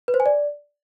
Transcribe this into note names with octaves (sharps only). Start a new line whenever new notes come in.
B4
C5
G#5
D5